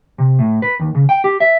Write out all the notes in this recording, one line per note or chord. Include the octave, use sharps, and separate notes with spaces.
C3
A2
B4
D#2
C#3
G5
G4
E5